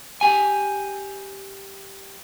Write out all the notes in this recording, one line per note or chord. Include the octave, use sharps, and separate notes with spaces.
G4 G#5